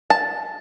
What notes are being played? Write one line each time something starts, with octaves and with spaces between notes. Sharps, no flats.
A5